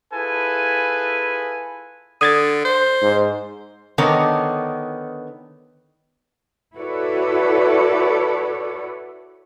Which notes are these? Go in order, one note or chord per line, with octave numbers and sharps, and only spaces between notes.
E4 F4 G#4 A4 B4 G#5
D3 D#6 G#6 A6
C5
G#2
D3 D#3 B3 D#4 A#4 C#5
E4 F#4 A4 B4 C#5 D5